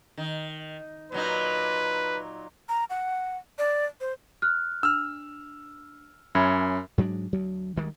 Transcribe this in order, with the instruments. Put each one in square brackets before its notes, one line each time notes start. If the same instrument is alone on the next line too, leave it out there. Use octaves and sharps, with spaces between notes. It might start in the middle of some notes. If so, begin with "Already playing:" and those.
[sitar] D#3
[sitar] A#2 F#3 D#4 [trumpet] B4
[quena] A#5
F#5
D5
C5
[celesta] F6 F#6
[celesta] D4 [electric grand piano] E6 F6
[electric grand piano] F#2 C#4 [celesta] E5 B5 G#6
[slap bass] G#2 F#3 G#3 D4
D2 F#3
D2 D#3 G3 G#3